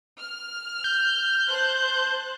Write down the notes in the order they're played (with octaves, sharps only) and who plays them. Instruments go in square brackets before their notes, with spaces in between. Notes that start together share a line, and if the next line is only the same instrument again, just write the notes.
[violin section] F6
[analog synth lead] G6
[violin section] C5 A5 F#6